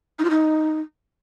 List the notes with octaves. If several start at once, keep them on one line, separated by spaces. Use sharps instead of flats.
D#4
F4
D#4